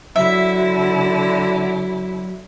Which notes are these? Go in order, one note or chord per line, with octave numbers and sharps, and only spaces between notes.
D3 F#3 E4 E5